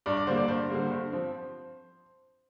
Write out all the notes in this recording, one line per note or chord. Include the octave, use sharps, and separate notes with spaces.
G2 D5
D5
D3 G3 A#3 C5
D5
G2 C5
D3 G3 A#3
G2
F3 C4